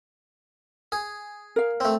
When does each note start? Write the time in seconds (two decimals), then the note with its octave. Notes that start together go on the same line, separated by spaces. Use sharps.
0.92 G#4
1.56 A#4 F5
1.80 A3 C4